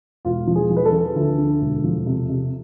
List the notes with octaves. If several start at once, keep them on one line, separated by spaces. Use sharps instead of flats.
E1 F4
F3
G#4
F3
B4
A4
F3
D2
D3
E1
F3
C3
C3